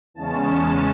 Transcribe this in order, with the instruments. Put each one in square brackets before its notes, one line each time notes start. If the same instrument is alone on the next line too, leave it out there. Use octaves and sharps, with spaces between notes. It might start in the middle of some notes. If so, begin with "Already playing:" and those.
[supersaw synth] E2 C#3 G#3 C#4 A5